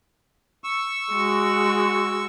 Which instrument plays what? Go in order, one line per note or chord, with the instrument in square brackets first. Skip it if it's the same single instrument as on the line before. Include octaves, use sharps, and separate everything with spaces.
[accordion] C#6 E6
[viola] G#3 F#4